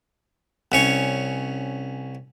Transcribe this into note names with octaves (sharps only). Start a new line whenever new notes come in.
C2 C#4 C#5